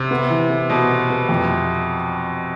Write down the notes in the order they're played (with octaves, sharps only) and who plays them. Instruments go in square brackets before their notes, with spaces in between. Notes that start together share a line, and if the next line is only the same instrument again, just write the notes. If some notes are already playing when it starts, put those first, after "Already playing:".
Already playing: [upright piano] C3
[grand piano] B3
E3
B3
[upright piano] B2 [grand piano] B3
[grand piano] B3
B3
F2